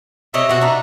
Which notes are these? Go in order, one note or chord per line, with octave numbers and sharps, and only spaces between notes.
C3 C#5 D#5 E5
B2 F#4
D4 D#4